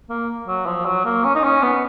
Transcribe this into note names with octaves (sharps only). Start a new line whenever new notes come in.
A#3
F#3
F3
F#3
A#3
C#4
D#4
C#4
B3